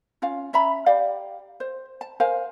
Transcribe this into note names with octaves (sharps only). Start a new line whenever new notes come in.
C#4 F4 F5
C#4 E5 A#5 B5
G4 D5 F5
C5
A5
A#4 C5 F5 G#5